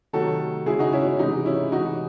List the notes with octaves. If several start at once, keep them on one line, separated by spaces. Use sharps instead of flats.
C3 D#3 F#3 A3 F#4 A4
C#3 G#3 E4 G#4
D#4 F#4
C#4 E4
C#4
C3 E3 G#3 D#4
C#4 E4
C3 E3 G#3 D#4 F#4